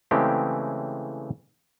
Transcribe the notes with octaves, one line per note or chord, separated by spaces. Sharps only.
C#3 E3 G#3 A3 C4 G4